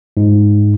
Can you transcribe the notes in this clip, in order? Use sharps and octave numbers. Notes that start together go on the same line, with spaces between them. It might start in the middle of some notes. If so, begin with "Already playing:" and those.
G#2